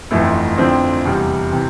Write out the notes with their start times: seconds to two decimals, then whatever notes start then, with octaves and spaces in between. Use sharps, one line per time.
0.11 G1 F2 E3 A3 E4
0.58 F2 D3 F3 C4 E4
1.05 E2 C3 G3
1.52 C3 E3